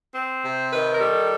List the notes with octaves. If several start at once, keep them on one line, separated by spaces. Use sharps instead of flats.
C4
C3
D#3 B4
A#4
G3 A4